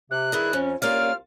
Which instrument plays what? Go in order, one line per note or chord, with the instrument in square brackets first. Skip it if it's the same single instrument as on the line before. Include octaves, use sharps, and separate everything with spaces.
[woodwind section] C3 [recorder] F#6
[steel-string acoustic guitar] G2 D#3 D4 [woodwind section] E4 G#4
[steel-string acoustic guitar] F2 [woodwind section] C#4
[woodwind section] C2 F4 F5 [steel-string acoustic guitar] A#3 C#4 D5 [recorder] F6